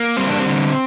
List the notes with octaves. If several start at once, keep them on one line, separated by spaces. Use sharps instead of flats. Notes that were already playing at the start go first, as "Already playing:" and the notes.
Already playing: A#3
G3 C4
D4
C4
D3